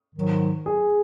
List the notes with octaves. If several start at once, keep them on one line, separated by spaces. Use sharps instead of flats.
G#2 D#3 F#3
G#4